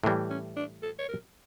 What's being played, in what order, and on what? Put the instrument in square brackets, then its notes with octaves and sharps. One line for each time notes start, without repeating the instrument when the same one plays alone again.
[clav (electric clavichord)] A2 E3 G3 [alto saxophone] A#3
[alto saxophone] C#4
D4
A4
C#5
A#4